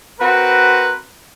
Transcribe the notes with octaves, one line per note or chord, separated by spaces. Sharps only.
C4 F#4 A#4 B4